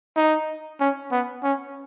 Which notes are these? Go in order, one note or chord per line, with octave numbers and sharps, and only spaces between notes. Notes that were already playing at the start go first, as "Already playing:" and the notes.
D#4
C#4
B3
C#4